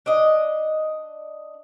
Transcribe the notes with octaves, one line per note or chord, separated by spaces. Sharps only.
D4 D#5